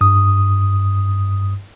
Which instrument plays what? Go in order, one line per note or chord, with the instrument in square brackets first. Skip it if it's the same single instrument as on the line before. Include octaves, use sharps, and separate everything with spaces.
[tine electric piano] G2 D#6